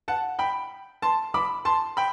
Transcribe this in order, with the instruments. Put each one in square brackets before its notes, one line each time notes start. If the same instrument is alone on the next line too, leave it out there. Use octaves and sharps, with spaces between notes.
[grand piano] F#5 A5
G5 B5
A5 C6
B5 D6
A5 C6
G5 B5